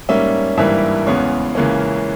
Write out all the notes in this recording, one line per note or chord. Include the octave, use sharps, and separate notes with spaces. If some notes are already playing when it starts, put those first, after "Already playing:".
G#2 G3 A#3 C#4 E5
G#1 G2 E3 G3 A#3 E5
E2 C#3 G#3 B3 C#5
C#2 C#3 E3 A#3 C#4